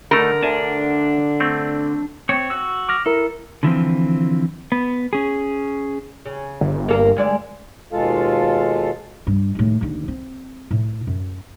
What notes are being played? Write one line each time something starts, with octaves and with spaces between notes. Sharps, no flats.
D3 A3 D#4 A#4
D2 D4 G#5 A5
A3 C4
C4 C#5
F#4 E6
D6 F6 A#6
E4 A4 A#4
D3 E3 F3 C4
B3
C#4 G#4
C#3
G1
A#3 A4 A#4
D2 G#3 D5
D#2 B2 G#3 F4 A4 F5
G2
D#2 A2
D#2 D3
C4
A2
F#2